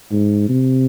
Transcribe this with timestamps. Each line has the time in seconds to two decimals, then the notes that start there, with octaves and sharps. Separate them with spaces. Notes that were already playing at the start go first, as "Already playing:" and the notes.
0.11 G#2
0.49 C3